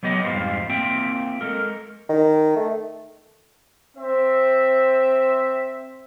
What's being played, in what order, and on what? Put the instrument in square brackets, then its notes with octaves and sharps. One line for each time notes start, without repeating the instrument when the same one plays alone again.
[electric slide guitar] F#3 B3 G4 D#5
F2 G#2 C3 G3 F4 C5
A#3 C4 F4 E5 G5
G#3 A4 A#4
[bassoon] D#3
A3
[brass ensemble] C4 C5 E5